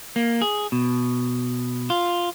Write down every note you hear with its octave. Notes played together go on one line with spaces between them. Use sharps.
A#3
G#4
B2
F4